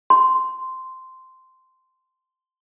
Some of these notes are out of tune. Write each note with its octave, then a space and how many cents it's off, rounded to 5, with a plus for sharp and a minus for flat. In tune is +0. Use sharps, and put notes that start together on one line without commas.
C6 -10